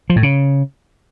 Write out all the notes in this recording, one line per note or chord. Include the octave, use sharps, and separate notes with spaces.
F3
A2
C#3